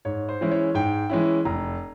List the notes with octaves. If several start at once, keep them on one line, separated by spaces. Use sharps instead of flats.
G#2 C#5
C5
E3 G#3 C#4 E4
C#5
G#2 G5
E3 G#3 C#4 E4
F1 A#5